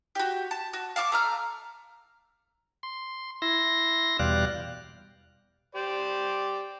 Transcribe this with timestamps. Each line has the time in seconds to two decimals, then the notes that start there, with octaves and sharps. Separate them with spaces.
0.15 F#4 G4
0.51 A5
0.73 F#4
0.96 F5 A5 C#6 D6
1.12 A3 A#5 F6
2.83 C6
3.42 E4 C6 A#6
4.19 E2 B2 G3 D5 F5 F#6
5.75 G4 C5 D5